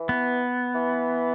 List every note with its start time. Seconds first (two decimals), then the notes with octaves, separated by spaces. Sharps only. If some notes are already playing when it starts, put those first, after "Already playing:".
Already playing: E3
0.09 B3
0.75 E3